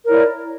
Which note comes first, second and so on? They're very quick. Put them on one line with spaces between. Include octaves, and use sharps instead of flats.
A#4 C#5 E4 D5